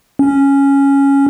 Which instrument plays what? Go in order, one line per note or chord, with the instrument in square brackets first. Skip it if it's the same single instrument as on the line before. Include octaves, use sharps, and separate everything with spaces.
[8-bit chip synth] C#4